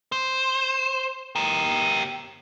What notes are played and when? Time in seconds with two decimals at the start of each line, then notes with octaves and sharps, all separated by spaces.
0.12 C5
1.36 G4 A#4